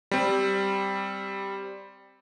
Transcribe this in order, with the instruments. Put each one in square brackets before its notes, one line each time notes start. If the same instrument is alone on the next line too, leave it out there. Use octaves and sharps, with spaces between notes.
[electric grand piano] G3 C4